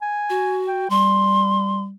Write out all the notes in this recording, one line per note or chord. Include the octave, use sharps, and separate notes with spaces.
G#5
F#4
G5
G3 C6